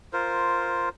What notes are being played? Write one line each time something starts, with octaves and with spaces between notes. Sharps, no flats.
F4 A#4 C5